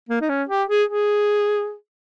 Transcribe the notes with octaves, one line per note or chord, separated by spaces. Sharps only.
A#3
D#4
C#4
G4
G#4
G#4